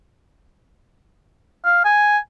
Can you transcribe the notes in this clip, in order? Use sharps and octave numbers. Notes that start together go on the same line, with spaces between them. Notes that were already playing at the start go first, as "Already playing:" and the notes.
F5
G#5